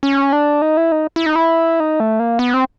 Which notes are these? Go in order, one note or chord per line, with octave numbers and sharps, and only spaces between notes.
C#4
D4
D#4
E4
D#4
E4
D#4
E4
D#4
A3
A#3
B3
C4